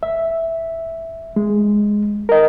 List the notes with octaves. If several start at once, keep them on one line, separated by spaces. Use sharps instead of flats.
E5
G#3
A#4 D#5